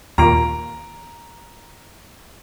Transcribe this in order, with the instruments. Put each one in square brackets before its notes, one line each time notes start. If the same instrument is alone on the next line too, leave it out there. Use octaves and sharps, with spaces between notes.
[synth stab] D#2 A#2 [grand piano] A#5 D7